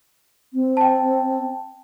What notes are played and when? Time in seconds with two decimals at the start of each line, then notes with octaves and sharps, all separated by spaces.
0.54 C4
0.77 G5 A5